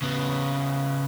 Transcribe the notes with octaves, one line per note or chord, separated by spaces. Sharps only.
C#3 B3